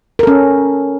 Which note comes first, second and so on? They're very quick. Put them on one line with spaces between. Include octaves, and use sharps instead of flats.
A#4 A4 C#4